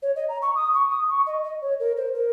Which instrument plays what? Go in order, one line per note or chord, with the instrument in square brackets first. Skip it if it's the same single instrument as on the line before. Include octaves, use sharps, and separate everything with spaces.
[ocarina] C#5
D#5
A#5
C#6
D#6
C#6
D#6
C#6
D#5
D#5
C#5
A#4
C5
A#4